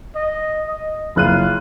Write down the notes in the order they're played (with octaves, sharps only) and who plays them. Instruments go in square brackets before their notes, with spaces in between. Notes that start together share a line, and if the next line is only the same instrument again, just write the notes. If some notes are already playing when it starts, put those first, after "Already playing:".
[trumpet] D#5
D#5
[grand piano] F#1 F#6 D#7 [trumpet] F4